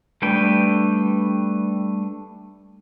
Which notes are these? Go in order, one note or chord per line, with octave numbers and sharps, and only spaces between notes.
G3 A3 D4 B4 G5